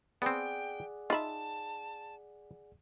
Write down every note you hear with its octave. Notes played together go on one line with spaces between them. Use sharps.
B3 C4 G#4 D5 F#5 G5
D#4 F4 E5 A5 B5